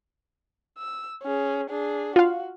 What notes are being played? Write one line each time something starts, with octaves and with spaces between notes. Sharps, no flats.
E6
C#4 G#4
D4 G#4
F4 F#4 F5